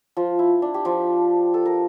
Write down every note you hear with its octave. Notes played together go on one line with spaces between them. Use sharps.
F3 F4
E4
D4
G4
F3 F4
A4
A#4